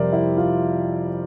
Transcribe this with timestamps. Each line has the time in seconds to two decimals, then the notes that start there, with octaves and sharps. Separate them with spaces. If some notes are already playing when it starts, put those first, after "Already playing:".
Already playing: F2 C3 G3 C4 A#4 C5 D5 E5
0.13 E4
0.37 F4